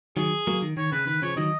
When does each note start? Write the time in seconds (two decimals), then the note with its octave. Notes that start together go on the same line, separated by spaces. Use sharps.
0.17 D#3 F#3 G#4
0.47 F#3 A#3
0.62 D#3
0.77 D#3 C#5
0.92 C#3 B4
1.07 D#3 B4
1.22 C#3 F3 C#5
1.37 D#3 F#3 D#5